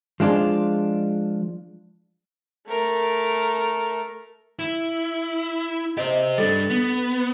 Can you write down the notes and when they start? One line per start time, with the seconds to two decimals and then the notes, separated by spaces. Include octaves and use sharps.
0.20 F3 G#3 D4 F4
2.68 A3 A#4
4.59 E4
5.97 G4 C5 D#5
6.38 G3 D4 A4 A6
6.70 B3